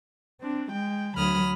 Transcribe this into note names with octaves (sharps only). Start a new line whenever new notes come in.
C4 D4
G#3 G5
D2 F#3 B5 D#6 F6